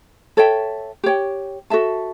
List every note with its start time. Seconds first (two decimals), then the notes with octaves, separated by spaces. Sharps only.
0.37 A4 C#5 E5 G5
1.04 G4 C#5 G5
1.70 F#4 A4 E5 A5